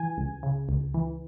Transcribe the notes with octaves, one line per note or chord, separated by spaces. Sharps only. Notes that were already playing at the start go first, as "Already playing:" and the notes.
Already playing: E3 G#5
C#2
C#3
C#2
E3